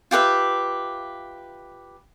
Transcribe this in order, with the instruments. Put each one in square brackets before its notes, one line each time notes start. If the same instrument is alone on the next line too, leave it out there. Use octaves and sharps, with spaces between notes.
[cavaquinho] F4 G4 B4 E5